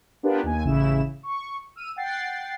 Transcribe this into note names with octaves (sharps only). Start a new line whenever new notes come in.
B3 D4 F4 G4 A#4 B4
D#2 G#5
A1 C#3 E4 E7
C#6
E6 F6 D#7
F#5 G5 A6 C7